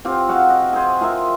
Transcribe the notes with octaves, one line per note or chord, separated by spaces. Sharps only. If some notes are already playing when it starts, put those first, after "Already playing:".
C4 F4 G4
F#4 G#4 F5 F#5
D#5
G#4 C5
F4 G#4 A#4 E5